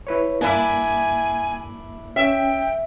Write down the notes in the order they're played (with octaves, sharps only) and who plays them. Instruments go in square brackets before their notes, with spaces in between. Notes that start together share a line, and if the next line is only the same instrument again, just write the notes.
[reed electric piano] E4 B4 C#5
[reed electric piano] G2 A#3 [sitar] D4 E4 [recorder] G#5
[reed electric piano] C#4 [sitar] E5 [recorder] G5